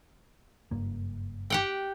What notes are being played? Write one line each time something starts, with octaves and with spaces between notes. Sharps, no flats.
F#1 G2 A#3
G4 F#5 G5